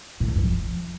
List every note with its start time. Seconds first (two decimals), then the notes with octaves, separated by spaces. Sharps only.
0.20 A2
0.28 E2
0.36 G2
0.44 F3